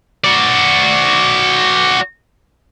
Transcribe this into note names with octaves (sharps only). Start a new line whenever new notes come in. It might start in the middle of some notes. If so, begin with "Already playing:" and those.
F#4 D5